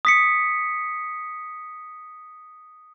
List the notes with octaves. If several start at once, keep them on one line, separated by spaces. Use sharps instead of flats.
D#6 B6 C#7